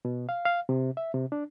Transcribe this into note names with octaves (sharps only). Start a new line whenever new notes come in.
B2
F5
F5
C3
E5
C3
D4